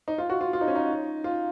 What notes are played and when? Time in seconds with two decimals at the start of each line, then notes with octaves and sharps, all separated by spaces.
0.08 D#4
0.18 F4
0.30 F#4
0.41 F4
0.53 F4
0.61 D#4
0.68 C#4
0.75 D#4
1.24 F4